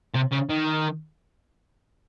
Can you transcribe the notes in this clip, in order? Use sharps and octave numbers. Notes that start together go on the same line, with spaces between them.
C3
C#3
D#3